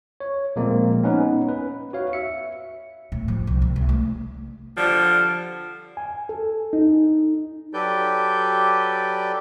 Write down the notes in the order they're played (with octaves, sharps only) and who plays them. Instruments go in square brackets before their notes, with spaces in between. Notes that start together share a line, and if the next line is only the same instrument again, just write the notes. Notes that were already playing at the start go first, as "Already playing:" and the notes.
[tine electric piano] C#5
A#2 F3 G#3 A#3 C4
B3 C#4 D#4 B4
B4
F#4 C#5 F5
E5 C#7
[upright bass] A2
F3
C2
C3
C2
A3
[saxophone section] D3 F3 G3
[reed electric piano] G#5
A4
D#4
[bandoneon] F#3 G4 A4 B4 D5 G6